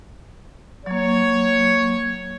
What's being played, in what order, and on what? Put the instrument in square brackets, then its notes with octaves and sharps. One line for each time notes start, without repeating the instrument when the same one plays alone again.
[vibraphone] F#3 A#3 [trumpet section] C#5